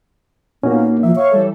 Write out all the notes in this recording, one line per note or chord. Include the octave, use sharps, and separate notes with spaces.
A#2 A#3 B3 C#4 D#4 F#4
F3 E5
C#5 F5 C#6
E3 G3 A4